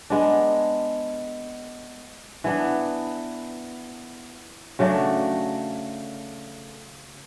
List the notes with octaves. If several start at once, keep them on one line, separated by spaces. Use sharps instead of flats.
G#3 B3 D4
E3 B3 D4
C#3 F#3 A3 D4